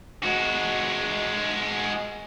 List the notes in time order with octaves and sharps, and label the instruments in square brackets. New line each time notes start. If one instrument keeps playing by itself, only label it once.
[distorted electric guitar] G#3 F#4